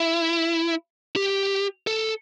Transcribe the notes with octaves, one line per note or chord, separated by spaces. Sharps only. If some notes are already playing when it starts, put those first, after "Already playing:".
Already playing: E4
G4
A4